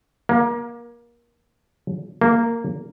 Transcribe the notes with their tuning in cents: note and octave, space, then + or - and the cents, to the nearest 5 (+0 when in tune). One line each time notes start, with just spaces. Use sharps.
A#3 +25
A#3 -10